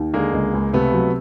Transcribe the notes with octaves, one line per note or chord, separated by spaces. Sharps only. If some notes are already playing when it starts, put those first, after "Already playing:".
Already playing: D#2
D3 G#3 A#3
C#2
C#2
C3 A3 B3
F#3